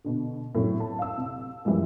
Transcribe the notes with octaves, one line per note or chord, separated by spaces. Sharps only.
B2 D3
A2 C3 F#3
A5
F5 E6
C3
F#2 E3 F3 G3 G#3